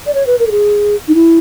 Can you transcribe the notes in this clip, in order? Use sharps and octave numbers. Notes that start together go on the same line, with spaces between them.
D5
C#5
B4
A#4
A4
G#4
D#4
E4